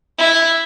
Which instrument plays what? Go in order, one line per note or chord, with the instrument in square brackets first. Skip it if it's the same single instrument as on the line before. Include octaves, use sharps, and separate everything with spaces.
[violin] E4